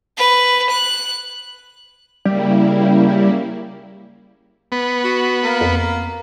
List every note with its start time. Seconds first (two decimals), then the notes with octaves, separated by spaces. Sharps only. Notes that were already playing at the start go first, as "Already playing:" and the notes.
0.17 B4
0.70 F#6
2.25 C#3 G3 A#3 E4
4.72 B3
5.04 F#4
5.43 A#3
5.61 F2